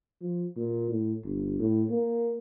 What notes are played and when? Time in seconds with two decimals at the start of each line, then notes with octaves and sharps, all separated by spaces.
0.22 F3
0.57 A#2
0.90 A2
1.24 G1
1.59 A2
1.90 A#3